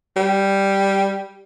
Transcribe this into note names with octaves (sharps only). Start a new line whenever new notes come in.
G3